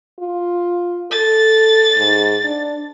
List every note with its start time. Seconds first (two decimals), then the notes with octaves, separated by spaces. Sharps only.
0.19 F4
1.12 A4 A6
1.97 G#2
2.44 D4